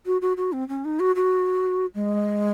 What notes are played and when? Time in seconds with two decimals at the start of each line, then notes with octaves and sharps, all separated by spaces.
0.06 F#4
0.22 F#4
0.37 F#4
0.53 C4
0.69 C#4
0.85 D#4
1.00 F#4
1.16 F#4
1.95 G#3